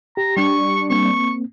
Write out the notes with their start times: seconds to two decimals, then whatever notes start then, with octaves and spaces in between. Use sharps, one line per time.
0.17 G4 A#5
0.37 G3 D4 C#6
0.90 A#3 C4 C#6